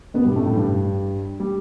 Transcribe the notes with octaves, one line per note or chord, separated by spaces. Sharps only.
B2 B3
G2 G3
A2 A3
A2 A3
G2 G3
G3